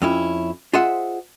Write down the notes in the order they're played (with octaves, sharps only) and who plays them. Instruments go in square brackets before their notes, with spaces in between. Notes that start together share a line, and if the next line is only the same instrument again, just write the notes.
[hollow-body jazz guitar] F2 C#4 E4
F4 G#4 C5 D#5 E5 F#5